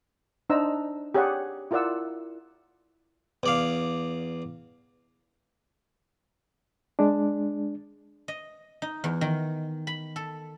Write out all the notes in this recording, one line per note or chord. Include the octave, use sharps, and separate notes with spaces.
D4 D#4 C5 A#5 E6
G4 G#4 C#5 D5 F#5
E4 F4 A#4 D5 F#5 E6
E2 D5 F5
G#3 D4
D#5
D#4
E2
D#3
B5
A4